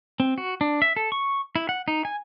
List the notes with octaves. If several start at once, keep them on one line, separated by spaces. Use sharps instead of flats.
C4
F#4
D4
E5
A4
C#6
E4
F#5
D#4
G#5